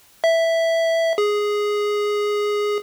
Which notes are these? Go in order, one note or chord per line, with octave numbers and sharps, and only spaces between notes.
E5
G#4